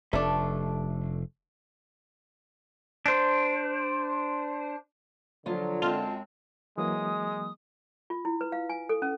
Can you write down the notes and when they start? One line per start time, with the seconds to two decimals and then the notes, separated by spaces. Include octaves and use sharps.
0.13 F1 A3 D4
3.06 D4 C5
5.46 D3 F3 F#3 F4
5.82 F#2 G#3 C4 F4 A5
6.78 E3 F#3 G#3 A#3 D#6
8.10 F4
8.25 E4
8.41 B4
8.52 F5
8.69 G#5
8.89 A4
9.02 C#4